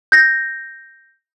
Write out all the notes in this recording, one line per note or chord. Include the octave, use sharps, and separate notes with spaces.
G6 A#6